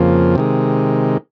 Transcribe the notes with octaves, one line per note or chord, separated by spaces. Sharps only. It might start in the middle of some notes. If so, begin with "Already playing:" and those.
Already playing: F2 C#3 F3 A#3
C3 D#3 G#3